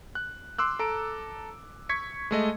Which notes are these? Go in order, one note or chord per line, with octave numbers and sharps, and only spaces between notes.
F#6
C6 D6 E6 F#6
A4 A#5 D7
C#6 G#6 B6 C#7
G#3 A3 D#5